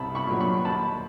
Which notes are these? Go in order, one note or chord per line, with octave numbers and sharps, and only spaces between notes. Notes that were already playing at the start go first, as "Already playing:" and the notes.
Already playing: C2 A5 B5
B5 C#6
A#2 F#3
B5 C#6
D#2 A5 B5